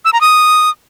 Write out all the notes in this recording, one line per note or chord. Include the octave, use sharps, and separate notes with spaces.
E6
A#5
D#6